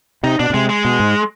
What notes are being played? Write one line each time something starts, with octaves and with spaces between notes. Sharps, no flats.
C3 D#4
B2 D4
B2
C3 G#3
G#3
B2
G#2